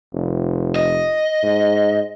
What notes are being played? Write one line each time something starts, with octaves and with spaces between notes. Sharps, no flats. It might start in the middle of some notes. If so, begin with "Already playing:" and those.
F1
D#5
G#2